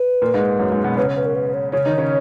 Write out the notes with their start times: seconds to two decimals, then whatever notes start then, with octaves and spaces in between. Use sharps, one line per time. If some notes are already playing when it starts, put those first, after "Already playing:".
Already playing: B4
0.22 A#2 A#3
0.34 G#2 G#3
0.59 F#2 F#3
0.72 G#2 G#3
0.84 B2 B3
0.97 C#3 C#4 B4
1.16 B4
1.26 A#4
1.35 B4
1.54 C#5
1.72 C#3 C#4 C#5
1.86 D#3 D#4
1.98 C#3 C#4